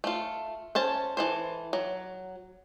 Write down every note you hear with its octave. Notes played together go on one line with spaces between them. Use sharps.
A3 F4
C#4 C5 A5
E3 A4 C5
F#3